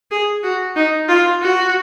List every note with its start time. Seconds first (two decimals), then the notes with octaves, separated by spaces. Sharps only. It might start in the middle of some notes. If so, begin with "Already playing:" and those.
0.11 G#4
0.43 F#4
0.76 D#4
1.09 F4
1.41 F#4